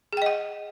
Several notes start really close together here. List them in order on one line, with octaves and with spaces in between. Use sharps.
G#4 G5 D#5 F#5